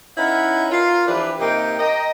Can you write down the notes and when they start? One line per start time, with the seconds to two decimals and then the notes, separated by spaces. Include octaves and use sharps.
0.17 C#4 D#4 E4 B4 F5 F#5
0.71 F4 A#4
1.07 E3 F3 D4 G4 B4
1.40 C3 A#3 D#4 G5
1.79 D#5 G5 A#5